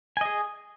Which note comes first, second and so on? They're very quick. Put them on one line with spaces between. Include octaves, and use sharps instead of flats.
G#5 D#5 G#4